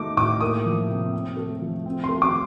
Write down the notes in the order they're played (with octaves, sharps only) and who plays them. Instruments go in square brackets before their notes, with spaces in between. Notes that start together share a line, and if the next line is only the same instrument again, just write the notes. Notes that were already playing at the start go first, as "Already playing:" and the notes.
Already playing: [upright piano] A3 D#4 D6
A2 D6
A#3 D#6
F3
C3
C4
A3
F3
C4
C6
A3
D6